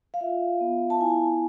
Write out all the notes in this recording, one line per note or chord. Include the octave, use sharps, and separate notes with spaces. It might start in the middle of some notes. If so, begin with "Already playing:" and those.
F5
F4 E5
B3
A5
E4 G#5